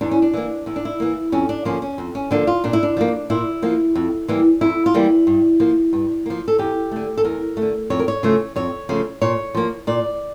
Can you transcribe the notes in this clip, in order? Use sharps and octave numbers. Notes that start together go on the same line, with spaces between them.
E2 D4
C#4
D4
E3 A#3
E2 E4
D4
E4
E3 A#3
F2 C#4
D4
D3 F3 A#3 C#4
C#4
F2
C#4
D3 F3 A#3 D4
F4
A#2 D4
E4
D4
F3 A#3
A#2 E4
F3 A#3
F2
E3 G3 A#3
F2 E4
F4
E3 G3 A#3 E4
G2
F3 A#3
G2
F3 A#3
A4
E2 G4
D3 A3
A4
E2 A#4
A3
D3
F2 C#5
A#4
C#5
C#3 F3 A3
F2 C#5
C#3 F3 A3
A#2 C#5
F3 A#3
A#2 D5